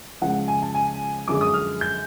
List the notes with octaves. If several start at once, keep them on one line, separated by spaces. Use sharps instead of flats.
C#2 C#3 F3 F#5
G#5
A5
G#5
F#2 D3 F3 G#3 D6
D#6
F6
G6